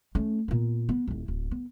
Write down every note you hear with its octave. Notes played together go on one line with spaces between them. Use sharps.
A3 C#4
A#2 B3
B3
D#1 E4
D1
B3